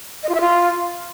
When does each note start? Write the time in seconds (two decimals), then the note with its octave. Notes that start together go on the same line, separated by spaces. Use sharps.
0.23 D#5
0.29 F4
0.35 E5
0.41 F4